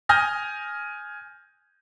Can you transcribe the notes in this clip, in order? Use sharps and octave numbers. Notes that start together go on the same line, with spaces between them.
G#5 D#6 F6 G6 A#6